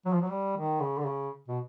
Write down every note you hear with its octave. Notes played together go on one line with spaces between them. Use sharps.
F#3
F3
F#3
G3
D#3
C#3
D3
C#3
B2